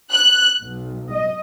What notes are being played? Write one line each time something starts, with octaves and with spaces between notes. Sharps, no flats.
F#6
B1
D#5